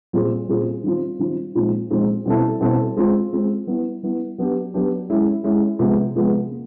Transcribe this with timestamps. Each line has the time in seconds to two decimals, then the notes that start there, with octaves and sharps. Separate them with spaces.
0.13 A#2 G3 C4 F4 G#4
0.49 A#2 G3 C4 F4 G#4
0.83 D#3 G3 C4 F4
1.19 D#3 G3 C4 F4
1.55 A#2 F3 G#3 C4 D#4
1.90 A#2 F3 G#3 C4 D#4
2.26 B2 G3 C4 E4 A4
2.60 B2 G3 C4 E4 A4
2.96 G#3 C4 F4
3.32 G#3 C4 F4
3.67 G3 B3 E4
4.03 G3 B3 E4
4.38 F#3 B3 D4 G4
4.74 F#3 B3 D4 G4
5.10 G#3 C#4 E4
5.44 G#3 C#4 E4
5.79 C3 F3 G#3 B3
6.15 C3 F3 G#3 B3
6.50 A#3